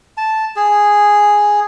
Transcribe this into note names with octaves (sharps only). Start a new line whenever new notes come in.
A5
G#4